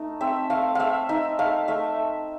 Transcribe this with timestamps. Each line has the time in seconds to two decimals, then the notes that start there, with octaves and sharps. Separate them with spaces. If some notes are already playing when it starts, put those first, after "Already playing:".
Already playing: A3 D#4
0.21 C4 E5
0.50 A3 F5
0.75 A3 E5 F5
1.09 D#4 E5
1.39 A3 F5
1.68 A3 E5